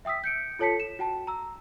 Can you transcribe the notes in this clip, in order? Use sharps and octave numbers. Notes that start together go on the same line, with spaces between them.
E5 G5 D#6 E6 B6
G6 C#7 D7
F4 A4 C#5 A5 B6 C#7
E7
F#4 G5 A5
A#5 E6